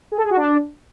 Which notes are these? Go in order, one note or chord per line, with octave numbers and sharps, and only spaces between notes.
G#4
A4
G#4
F#4
D4